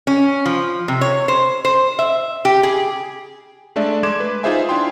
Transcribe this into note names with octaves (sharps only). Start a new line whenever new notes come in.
C#4
F3
C3
C#5
C5
C5
E5
G4
G#4
G#3 A3 D4 D5 E5
G#3 A3 C6 D6 G#6 E7
B4
D#4 F4 G#4 C5 E5 G#5
D4 E4 F4 F5 G5 C6